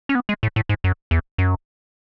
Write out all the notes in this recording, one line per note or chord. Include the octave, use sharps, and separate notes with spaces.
C#4
B3
G#3
A2
A2
G#2
F#2
E2
F#2